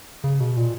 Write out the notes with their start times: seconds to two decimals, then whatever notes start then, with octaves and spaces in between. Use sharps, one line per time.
0.24 C#3
0.40 B2
0.57 A#2